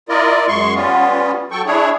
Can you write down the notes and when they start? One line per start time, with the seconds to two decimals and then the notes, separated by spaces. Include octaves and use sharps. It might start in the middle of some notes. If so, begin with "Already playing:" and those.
0.09 E4 F4 A#4 D5 D#5
0.48 F#2 G#3 C6 C#6
0.75 G3 B3 C#4 F4
1.51 F#3 A4 G5 C#6
1.66 D4 E4 G#4 C#5